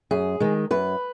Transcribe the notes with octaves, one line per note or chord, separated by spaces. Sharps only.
F#2 G#4
D#3 G#3
F#2 B4